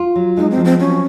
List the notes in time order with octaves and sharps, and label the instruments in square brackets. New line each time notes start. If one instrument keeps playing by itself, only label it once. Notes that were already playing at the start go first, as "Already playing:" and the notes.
Already playing: [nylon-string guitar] F4
F#3
[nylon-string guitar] G#3 [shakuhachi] D#4
[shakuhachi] C4
[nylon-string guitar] F3
[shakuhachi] C4
[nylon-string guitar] F#3 [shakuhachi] C#4